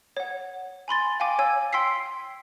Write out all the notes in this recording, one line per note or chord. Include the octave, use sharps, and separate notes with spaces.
C#5 F#5
G#5 B5 C6 A6
F5 G5 G#5 D6
C#5 G#5 E6
G5 C6 E6 B6 C7